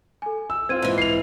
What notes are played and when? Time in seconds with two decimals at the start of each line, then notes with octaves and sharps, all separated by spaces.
0.22 A4 G#5
0.50 E6
0.69 C4 F4 G#6 D#7
0.82 G#2 E3
0.98 C7 F7